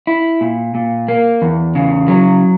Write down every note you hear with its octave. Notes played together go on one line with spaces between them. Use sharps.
E4
A#2
A#2
A#3
E2
C#3
F#3